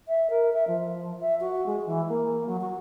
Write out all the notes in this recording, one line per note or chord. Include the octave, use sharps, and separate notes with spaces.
E5
A#4
E5
F3
E5
F#4
G#3
E3
A#3
F#3
F#4